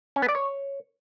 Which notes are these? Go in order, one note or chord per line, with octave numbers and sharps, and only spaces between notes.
C#4
B3
D5
C#5